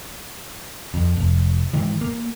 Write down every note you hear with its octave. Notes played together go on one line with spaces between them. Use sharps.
F2
F1
G#2 D#3 E3
A#3